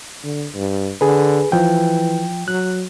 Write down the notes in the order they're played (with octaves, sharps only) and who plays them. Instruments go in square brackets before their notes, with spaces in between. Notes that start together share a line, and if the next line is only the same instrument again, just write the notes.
[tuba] D3
G2
[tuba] D3 [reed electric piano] G#4 B4
[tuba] E3 [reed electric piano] F3 G5
[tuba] F#3 [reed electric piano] F#6